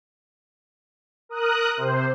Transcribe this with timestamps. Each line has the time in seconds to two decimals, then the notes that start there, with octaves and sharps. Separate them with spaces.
1.29 A#4 D#6 F#6
1.77 C3 C5